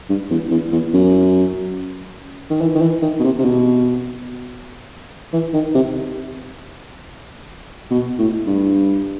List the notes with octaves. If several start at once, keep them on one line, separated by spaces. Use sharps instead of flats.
G2
E2
E2
E2
F#2
D#3
E3
D#3
E3
D#3
B2
C3
C3
B2
E3
D#3
C3
B2
A2
G2